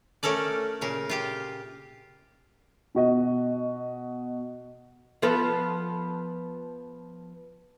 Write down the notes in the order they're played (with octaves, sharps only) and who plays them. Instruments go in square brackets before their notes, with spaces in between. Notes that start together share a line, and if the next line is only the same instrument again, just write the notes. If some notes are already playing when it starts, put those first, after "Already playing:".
[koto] A3 C#4 A4 A#4 D5
A#2 C#3 A#4
F4 G4 G5
[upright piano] B2 F#4 D#5
[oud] F3 B3 A4